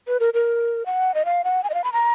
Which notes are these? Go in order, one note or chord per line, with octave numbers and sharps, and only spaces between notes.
B4
A#4
A#4
F#5
D#5
F5
F#5
G#5
D#5
F5
B5
A#5